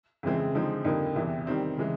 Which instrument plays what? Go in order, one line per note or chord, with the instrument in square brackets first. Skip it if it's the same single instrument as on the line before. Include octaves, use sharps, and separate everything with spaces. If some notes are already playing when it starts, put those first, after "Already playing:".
[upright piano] F2 C#3 E3 G#3 C4
D3 F3 G#3 C4 D#4
F2 D3 G3 A#3 D#4
E2 C3 E3
D#3 G3 C4
C#3 E3 G#3